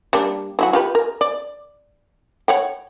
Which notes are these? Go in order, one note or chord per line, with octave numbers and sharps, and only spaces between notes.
G3 A#3 D4
F#3 E4 F#4
F4 G4 B4
A#4
D5
C#5 F#5 G5